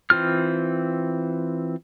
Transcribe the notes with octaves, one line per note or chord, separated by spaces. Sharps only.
E3 C4 F4 F6